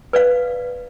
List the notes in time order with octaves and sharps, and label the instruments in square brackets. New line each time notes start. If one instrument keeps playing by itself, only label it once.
[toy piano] B4 D5 F5